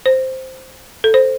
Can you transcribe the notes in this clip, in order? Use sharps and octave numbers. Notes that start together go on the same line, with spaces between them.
C5
A4
C5